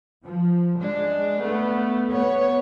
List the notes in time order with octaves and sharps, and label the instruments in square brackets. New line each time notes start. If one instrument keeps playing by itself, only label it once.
[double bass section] F3
[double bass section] G#3 [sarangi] D4
[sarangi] A3 [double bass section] B3
[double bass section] B3 [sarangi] C#5